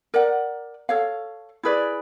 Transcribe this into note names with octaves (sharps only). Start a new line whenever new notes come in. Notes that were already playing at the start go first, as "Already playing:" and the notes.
A#4 D5 F#5
A4 C#5 F5
E4 G#4 B4 D5